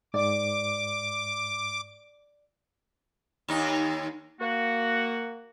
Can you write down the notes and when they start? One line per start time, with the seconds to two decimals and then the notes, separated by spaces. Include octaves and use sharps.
0.14 G#2 D5 D6
3.48 D#2 D#4
4.40 A#3 F#4